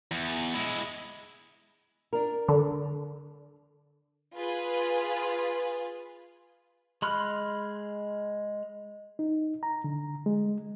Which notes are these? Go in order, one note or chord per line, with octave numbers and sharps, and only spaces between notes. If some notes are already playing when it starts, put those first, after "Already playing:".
E2
G#3 E4
D4 A#4
D3
F4 G#4 B4
G#3 B5 C6 F6 F#6
D#4
A#5
D3
G#3